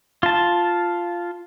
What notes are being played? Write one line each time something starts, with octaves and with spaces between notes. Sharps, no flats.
F4 A5